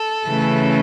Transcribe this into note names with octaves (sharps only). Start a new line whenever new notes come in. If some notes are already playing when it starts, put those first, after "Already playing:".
Already playing: A4
C#3 E3 A3 C#4